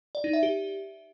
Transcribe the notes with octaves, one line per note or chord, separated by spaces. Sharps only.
D5
D#4
E5
G4